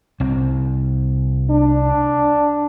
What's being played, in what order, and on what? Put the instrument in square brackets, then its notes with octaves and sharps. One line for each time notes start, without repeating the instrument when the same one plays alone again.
[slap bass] C2 C4
[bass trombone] D4